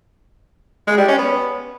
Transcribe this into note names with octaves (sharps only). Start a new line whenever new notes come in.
G#3
G3
C#4
B3